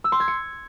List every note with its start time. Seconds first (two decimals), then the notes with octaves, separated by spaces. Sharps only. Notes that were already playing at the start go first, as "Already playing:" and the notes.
0.04 E6
0.12 C6
0.20 G#6
0.28 C#7